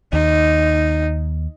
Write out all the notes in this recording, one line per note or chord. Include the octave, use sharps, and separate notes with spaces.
D#2 D#4